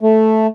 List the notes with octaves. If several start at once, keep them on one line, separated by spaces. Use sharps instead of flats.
A3